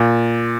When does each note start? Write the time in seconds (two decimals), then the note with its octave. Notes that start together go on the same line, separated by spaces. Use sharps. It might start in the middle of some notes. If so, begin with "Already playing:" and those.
Already playing: A#2